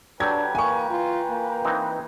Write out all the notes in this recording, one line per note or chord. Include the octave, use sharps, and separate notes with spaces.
F#3 D4 G4 A4 B4 G5 A#5 G#6
E3 A#3 G#5 C#6
F4
A#3
E3 C4 D#4